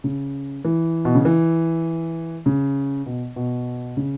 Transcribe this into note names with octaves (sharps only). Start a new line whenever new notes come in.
C#3
E3
B2
C#3
E3
C#3
B2
B2
C#3